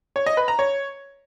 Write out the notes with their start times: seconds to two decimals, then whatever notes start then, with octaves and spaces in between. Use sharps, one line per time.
0.16 C#5
0.26 D#5
0.37 B4
0.48 A#5
0.59 C#5